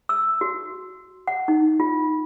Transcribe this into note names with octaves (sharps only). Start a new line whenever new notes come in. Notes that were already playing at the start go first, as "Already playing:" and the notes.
E6
F#4
F#5
D#4
F4